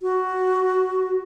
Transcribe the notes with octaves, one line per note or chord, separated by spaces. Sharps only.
F#4